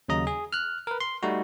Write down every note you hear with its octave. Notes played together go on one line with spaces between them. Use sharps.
D#2 C#3 F#3 D#5 A#5
G#4
F6 F#6
A#4 B4
C6
G3 A3 D#4 F#4